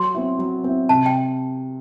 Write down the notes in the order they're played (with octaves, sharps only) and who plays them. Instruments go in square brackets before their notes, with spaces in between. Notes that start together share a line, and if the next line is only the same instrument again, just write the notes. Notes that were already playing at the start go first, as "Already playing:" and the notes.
Already playing: [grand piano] F#3 [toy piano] C6
[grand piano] C4 E4
F#3
C4 E4
[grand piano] C3 [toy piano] A5
[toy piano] G5